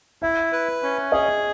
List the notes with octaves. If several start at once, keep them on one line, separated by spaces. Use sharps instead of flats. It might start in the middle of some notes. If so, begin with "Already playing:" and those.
E4 E5
B4
C#4
G#4 D#5